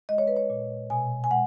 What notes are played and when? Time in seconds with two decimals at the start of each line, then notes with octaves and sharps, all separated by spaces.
0.09 G#3 D#5
0.18 C#5
0.27 B4
0.36 C#5
0.50 A#2
0.90 B2 G#5
1.24 G#5
1.31 G#3 F#5